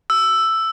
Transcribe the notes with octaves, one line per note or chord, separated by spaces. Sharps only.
E6